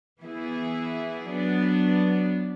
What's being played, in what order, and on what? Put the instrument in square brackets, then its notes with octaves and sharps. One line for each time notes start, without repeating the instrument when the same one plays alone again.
[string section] E3 B3 E4 G#4
F#3 B3 D4